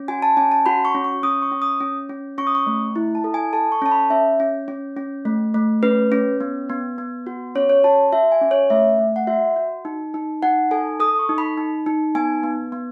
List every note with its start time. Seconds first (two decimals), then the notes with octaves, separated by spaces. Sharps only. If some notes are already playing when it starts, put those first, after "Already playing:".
Already playing: C#4
0.08 F#4 G#5
0.22 A5
0.37 C#4 G#5
0.52 A5
0.66 F#4 B5
0.85 C#6
0.95 C#4
1.04 C#6
1.23 C#4 D#6
1.42 C#6
1.52 C#4
1.62 D#6
1.81 C#4
2.09 C#4
2.38 C#4 C#6
2.47 D#6
2.55 C#6
2.67 A3
2.96 E4
3.15 A5
3.24 A4
3.34 G#5
3.53 A4 A5
3.72 C#6
3.82 C#4 A5
3.92 B5
4.10 C#4 E5
4.40 C#4
4.68 C#4
4.97 C#4
5.25 A3
5.54 A3
5.83 C#4 B4
6.12 C#4
6.40 B3
6.70 B3
6.98 B3
7.27 F#4
7.55 C#4 C#5
7.69 C#5
7.84 F#4 A5
8.12 F#4 E5
8.32 G#5
8.41 C#4
8.51 C#5
8.70 A3 E5
8.99 A3
9.16 F#5
9.27 F#4 E5
9.56 F#4
9.85 D#4
10.14 D#4
10.43 D#4 F#5
10.71 A4 G#5
11.00 A4 D#6
11.19 C#6
11.29 D#4
11.38 B5
11.58 D#4
11.86 D#4
12.15 B3 G#5
12.43 B3
12.72 B3